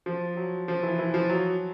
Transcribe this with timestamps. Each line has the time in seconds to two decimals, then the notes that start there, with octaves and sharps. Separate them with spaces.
0.06 F3
0.37 F#3
0.68 F3
0.83 E3
0.99 E3
1.14 F3
1.29 F#3